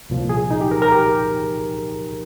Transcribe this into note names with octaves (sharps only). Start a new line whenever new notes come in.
C2 A#2 F3
G#4
D#4
G4
A#4
A#4
G4